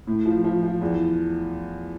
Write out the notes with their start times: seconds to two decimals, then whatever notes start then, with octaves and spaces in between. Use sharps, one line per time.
0.07 A2
0.26 F3
0.44 F3
0.63 F3
0.81 E2